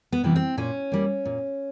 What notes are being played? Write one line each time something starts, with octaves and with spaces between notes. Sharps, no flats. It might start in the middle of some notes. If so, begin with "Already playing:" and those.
B3
C3 E3 G3 B3
C4
A#2 C#4
G3 A#3
A#2